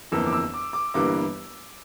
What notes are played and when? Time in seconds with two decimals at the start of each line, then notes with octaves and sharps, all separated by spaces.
0.12 G1 F2 E3 A#3 E6
0.26 D6
0.32 E6
0.54 D6
0.73 D6
0.94 G1 G2 E3 G3 A#3 D6